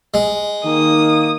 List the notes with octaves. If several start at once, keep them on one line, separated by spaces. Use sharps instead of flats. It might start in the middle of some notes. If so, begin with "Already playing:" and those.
G#3
D#3 A#3 D#6